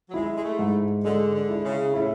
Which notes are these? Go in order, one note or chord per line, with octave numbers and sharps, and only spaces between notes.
F#3
G#3 E4
G#3
A3
G#2
D3 G#3
D3
E4
C#3
A2 E4